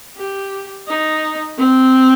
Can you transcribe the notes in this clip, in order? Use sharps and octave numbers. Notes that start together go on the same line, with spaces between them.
G4
D#4
C4